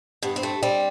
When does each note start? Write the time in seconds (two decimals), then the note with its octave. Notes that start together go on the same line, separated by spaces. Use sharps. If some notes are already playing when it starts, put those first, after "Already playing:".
0.22 G2 B3
0.36 C4
0.43 A3
0.63 G3 C4